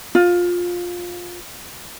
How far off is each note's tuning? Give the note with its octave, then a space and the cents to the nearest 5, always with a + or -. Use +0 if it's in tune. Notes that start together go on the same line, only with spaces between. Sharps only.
F4 +15